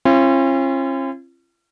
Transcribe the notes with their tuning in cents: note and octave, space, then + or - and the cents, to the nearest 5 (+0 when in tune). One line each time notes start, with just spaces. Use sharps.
C#4 -45 F4 -40